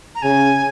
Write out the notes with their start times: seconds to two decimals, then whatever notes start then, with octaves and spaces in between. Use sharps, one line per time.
0.15 A#5
0.22 C#3 G#5